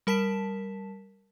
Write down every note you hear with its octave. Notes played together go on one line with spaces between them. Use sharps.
G3 A#4 A5 B6 E7